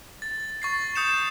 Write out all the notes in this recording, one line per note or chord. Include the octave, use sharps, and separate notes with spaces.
A6
C#6 A6 C7
D#6 G6 C#7 E7